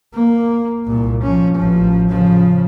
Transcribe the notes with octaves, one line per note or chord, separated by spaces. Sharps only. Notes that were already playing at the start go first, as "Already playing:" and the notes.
A#3
C2 A#2
F3 C#4
A1 F3
C#3 F3